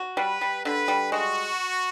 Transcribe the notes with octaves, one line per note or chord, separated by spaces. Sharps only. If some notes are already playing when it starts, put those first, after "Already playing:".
Already playing: F#4
G3 B4
G3
D3 B4
G3
G#3 F#4